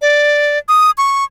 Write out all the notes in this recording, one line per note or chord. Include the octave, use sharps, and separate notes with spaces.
D5
D#6
C#6